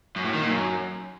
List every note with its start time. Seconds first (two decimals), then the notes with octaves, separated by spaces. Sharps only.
0.16 F#2
0.25 A2
0.33 D#3
0.41 A#2
0.50 F#2